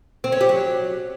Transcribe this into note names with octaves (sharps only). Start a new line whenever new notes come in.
C4
C#4
G4
F#3